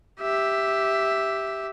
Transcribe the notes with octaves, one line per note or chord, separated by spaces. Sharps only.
G4 E5